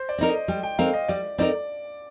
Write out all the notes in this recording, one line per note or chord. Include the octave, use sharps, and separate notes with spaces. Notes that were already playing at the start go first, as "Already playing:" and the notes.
Already playing: C5
D5
C4 D#4 A#4
D#5
G3 G5
G5
C4 D#4 A#4 F5
D#5
G3 D5
C4 D#4 A#4 D5